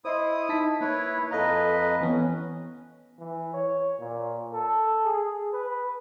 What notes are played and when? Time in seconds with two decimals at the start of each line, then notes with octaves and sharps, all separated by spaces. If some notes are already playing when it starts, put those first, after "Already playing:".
0.05 E4 C5 D#5 C6 D#6
0.49 D#4 A5 B6
0.81 A#3 E4 B4 C#5
1.31 F2 A4 B4 D#5 F5 A#5
2.01 E3 B3 C#4 C#5
3.19 E3
3.53 C#5
3.99 A#2
4.53 A4
5.04 G#4
5.53 B4